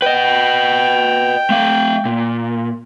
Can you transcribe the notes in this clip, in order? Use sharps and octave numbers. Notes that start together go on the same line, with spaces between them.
B4 D#5 G5
A3 F5
A#2